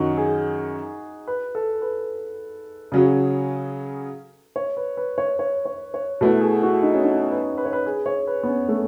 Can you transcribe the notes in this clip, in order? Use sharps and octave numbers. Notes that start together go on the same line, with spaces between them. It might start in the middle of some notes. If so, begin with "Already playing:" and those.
Already playing: F#2 D#3 F#3 C#4 D#4 F#4
G#4
B4
A4
B4
C#3 F#3 C#4 G#4
C#5
B4
B4
C#5
C#5
C#5
C#5
B2 A3 E4 B4
G#4
F#4
D#4
C#4
D#4
B4
B4
C#5
B4
G#4
C#5
B4
B3
C#4
A3